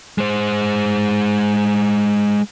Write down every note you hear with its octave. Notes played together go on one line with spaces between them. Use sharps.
G#3 C5